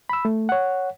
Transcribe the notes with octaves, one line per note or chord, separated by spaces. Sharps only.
B5 E6
A3
C#5 F#5